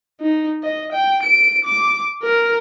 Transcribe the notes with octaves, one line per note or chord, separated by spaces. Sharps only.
D#4
D#5
G5
D7
D6
A#4